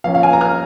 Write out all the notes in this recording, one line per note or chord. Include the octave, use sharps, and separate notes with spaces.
F3 A#3 C#4 F5
F5
G#5
A#5
F6